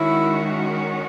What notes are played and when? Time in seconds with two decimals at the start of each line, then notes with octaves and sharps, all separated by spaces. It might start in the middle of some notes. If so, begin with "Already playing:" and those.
Already playing: D#3 G#3 C#4 E4 F#4